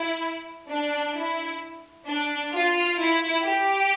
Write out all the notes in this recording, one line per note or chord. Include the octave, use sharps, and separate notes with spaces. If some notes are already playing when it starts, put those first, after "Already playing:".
Already playing: E4
D4
E4
D4
F4
E4
G4